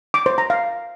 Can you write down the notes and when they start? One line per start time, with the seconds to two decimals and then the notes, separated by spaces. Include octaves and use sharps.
0.14 D6
0.26 C5
0.38 A#5
0.50 F5